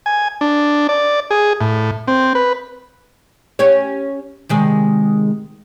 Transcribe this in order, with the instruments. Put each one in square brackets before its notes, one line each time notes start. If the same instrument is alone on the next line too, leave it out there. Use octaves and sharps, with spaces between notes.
[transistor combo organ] G#5
D4
D5
G#4
A2
C4
B4
[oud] C#4 G4 C#5
C3 D#3 G#3